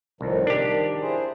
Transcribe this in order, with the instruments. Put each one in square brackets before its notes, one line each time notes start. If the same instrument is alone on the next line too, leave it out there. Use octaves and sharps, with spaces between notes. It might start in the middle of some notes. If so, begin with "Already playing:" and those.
[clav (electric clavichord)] C2 [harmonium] A2 D#3 F3
[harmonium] D#3 [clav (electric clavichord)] D4 G4
[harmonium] E4 G#4 C5